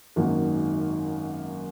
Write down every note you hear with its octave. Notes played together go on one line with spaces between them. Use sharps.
G#1 F#2 D#3 F#3 A#3